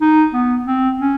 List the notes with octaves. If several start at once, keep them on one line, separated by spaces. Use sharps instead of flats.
D#4
B3
C4
C#4